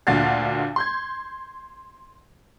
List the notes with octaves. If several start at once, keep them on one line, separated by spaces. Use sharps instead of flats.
D2 A#2 D3 F#4 F5 A6
C6 G6 G#6